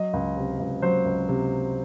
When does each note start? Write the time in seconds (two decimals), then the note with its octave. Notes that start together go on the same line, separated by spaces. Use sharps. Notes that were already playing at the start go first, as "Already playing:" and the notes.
Already playing: F#3 D#5
0.13 C#2
0.37 C3
0.59 C#2
0.82 F#3 C5
1.05 C#2
1.29 C3